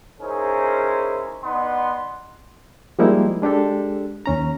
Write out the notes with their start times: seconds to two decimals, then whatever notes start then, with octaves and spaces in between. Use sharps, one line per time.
0.20 C#4 D#4 E4 G#4 A#4 C5
1.44 B3 D#4 D5 F#5 C6
2.99 F3 G3 G#3 A#3 D#4 E4
3.42 G#3 D4 G4 A4
4.26 D#2 C#4 A#5